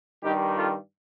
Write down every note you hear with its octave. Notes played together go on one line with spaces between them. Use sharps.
G2 D#3 G3 D#4 G4
F4 A4